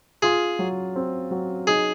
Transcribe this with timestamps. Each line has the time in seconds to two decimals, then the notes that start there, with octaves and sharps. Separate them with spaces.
0.22 F4 G#4
0.59 F#3
0.95 C4
1.31 F#3
1.67 D#4 G#4